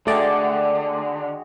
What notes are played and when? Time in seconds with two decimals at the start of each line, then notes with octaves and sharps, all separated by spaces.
0.07 D3 G#3 A3 F#4 D5 G5